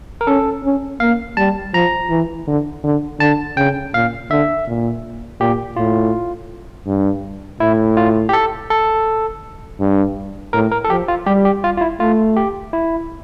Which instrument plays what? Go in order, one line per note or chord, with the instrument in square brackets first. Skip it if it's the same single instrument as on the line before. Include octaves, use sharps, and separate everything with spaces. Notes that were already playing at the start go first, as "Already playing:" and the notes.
[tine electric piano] A#4
[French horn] C#4 [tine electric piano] A4
[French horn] C#4
[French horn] A#3 [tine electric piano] F5
[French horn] G3 [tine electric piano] A5
[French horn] F3 [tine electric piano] A#5
[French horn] E3
D3
D3
[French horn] D3 [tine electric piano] A5
[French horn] C#3 [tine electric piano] G5
[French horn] A#2 [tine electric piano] F5
[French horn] D3 [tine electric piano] E5
[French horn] A#2
[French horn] A#2 [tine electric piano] G4
[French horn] A2 [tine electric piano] F4
[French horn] G2
[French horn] A2 [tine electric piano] E4
[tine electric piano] F4
G4
A4
A4
[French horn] G2
[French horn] A2 [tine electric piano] A#4
[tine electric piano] A#4
A4
[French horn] F3 [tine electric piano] G4
[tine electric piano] F4
[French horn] G3 [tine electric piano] G4
[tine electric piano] G4
F4
F4
E4
[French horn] A3 [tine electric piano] F4
[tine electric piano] G4
E4